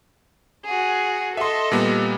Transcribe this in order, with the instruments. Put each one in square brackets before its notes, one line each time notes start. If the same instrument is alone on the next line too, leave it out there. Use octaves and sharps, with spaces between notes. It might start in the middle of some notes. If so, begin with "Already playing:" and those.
[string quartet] F#4 G#4
[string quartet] A4 D#5 [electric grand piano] E5 C6
[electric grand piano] A#2 G3 B3